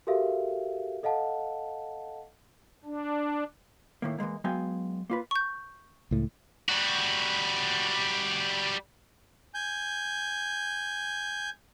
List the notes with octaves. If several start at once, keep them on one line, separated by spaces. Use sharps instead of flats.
F#4 G4 A4 A#4 E5 F5
A4 D#5 F5 F#5 A5
D4
A2 D#3 A#3
E3 F3 G#3 A#3
F#3 G#3 B3 F5 G5 G#5
A#3 F4 B4
C#6 G6
C#2 A2
G3 F#4
G#5 G6